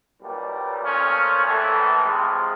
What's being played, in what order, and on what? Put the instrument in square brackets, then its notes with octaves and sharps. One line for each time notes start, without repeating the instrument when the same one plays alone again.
[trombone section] B1 A#2 G3
A#2 F3 A3 C#4
A#1 A2 E3 A3
C3 F3 G#3